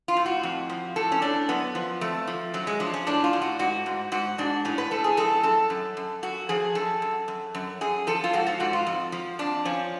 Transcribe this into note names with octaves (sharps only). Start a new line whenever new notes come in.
F4
A2
F#4
F2
F3
A2 A4
C#4
A2 D4
F#2 B3
F3
F2 A3
F3
F#2 F#3
G#3
F3 D4
C#4
A2 D4
F4
A2
F#4
G#2 F#4
G#2
G#2 F#4
G#2 D4
A2 C#4
B4
A2 A4
G#4
F#2 A4
F#2 A4
F#2
F#2
F#2 F#4
F3 G#4
F#2 A4
F#2
F#2
F#2
F#2 G#4
F3 A4
F4
G#2 F#4
F4
G#2 F#4
F4
F2
F3
F2 D4
F3 C#4